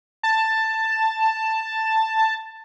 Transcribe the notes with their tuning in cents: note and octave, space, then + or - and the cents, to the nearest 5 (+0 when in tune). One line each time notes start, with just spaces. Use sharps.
A5 +10